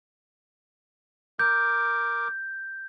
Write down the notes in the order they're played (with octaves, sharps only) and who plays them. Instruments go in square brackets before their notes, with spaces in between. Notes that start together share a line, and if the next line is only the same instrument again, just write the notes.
[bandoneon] A#4 D6 [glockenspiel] G6